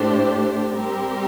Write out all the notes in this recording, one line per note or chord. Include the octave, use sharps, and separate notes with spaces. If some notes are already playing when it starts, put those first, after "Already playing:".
Already playing: A2 A3 D4 G4 C5
G3 C4 G4 A#4